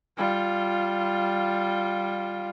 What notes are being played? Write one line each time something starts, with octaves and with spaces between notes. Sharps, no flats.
G3 F4